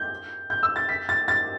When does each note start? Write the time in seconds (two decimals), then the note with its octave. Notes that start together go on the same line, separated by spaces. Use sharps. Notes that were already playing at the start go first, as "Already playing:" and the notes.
Already playing: G6
0.50 G6
0.63 E6
0.76 A6
0.89 B6
1.09 A6
1.28 A6